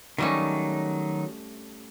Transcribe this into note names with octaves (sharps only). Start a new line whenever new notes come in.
D#3 F#3 G3 A3 C#4 D#4